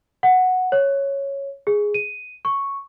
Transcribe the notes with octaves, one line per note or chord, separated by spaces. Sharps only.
F#5
C#5
G#4
D#7
C#6